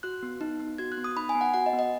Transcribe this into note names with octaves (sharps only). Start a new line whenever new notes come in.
F#4 F#6
B3
D#4
B3
F#4 G#6
F#6
B3
D#6
D#4 B5
G#5
B3
F#5
F#4 F#5
D#5
B3
D#5